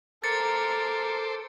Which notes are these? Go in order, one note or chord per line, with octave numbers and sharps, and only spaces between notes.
A4 A#4 C5 D6 A6 C#7